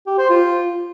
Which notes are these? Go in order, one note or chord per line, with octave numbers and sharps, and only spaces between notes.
G4
C5
F4